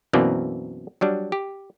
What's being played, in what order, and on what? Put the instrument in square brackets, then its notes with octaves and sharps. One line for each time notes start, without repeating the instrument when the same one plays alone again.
[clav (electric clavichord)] F#2 B2 E3 A#3 C4 D5
F#3 G3 D4
G4